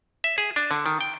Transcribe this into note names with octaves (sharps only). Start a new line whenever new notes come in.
E5
G#4
D4
D3
D#3
G5